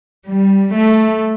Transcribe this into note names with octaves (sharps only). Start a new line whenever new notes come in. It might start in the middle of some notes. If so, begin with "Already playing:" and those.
G3
A3